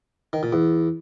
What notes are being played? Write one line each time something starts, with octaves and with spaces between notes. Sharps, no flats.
D#3
A#2
E2